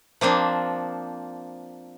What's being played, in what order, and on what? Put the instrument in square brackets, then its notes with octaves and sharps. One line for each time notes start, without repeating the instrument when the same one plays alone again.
[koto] F3 A#3 C4 D4